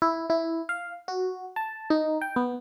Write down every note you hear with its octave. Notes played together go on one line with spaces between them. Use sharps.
E4
E4
F5
F#4
A5
D#4
G5
B3